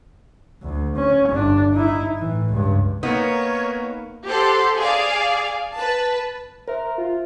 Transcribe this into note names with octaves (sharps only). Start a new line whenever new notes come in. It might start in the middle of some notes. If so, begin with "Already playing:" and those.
D2
C#4
G1 D4
D#4 E4
A2 E3
C#2 G2
A#3 B3 D#4 A#4 C#5
G4 A4 C5 F#5 C6
G#4 D5 F5
B4 A5
A#4 C5 E5
F4